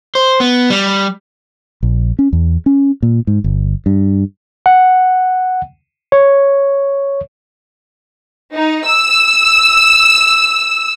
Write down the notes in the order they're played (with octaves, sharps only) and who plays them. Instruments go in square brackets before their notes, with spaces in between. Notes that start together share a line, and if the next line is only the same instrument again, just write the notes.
[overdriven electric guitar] C5
B3
G3
[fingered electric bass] A#1
C#4
E2
C#4
A#2
G#2
G1
G2
[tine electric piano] F#5
C#5
[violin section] D#4
E6